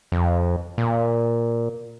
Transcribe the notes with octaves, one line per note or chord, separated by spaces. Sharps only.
F2
A#2